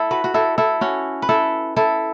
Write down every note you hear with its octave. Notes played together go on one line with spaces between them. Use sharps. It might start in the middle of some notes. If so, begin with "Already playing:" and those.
Already playing: E4 A4
F#4 B4
F#4
E4 A4
E4 A4
C#4 F#4
B4
E4 A4
E4 A4